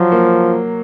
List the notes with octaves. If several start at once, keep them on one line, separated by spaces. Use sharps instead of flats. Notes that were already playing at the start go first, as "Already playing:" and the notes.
Already playing: F3 F#3
A#3